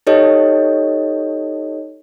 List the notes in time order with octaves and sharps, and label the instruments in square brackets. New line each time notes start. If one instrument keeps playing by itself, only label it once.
[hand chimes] D#4 G4 A4 C#5 D#5